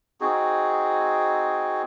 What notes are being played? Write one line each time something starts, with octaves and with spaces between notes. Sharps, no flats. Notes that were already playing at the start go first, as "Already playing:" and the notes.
C4 D#4 F#4 G#4